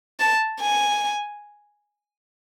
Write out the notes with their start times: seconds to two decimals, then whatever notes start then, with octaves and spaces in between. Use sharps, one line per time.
0.20 A5
0.61 G#5